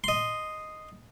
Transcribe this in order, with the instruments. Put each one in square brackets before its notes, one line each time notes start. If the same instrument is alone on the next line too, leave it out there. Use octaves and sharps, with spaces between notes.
[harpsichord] D#5 C6